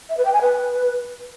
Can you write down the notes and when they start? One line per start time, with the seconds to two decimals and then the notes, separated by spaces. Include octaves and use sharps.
0.09 E5
0.17 B4
0.25 G5
0.33 G#5
0.41 B4